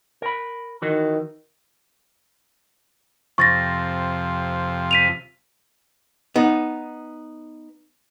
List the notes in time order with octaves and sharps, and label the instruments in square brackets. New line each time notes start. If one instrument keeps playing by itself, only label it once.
[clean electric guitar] A#4 B5
[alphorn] D#3 [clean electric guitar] E3 F#4 B4
[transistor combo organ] F2 C3 F3 [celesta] C#6 A6 A#6
[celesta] B6 D#7 F7
[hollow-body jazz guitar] B3 D#4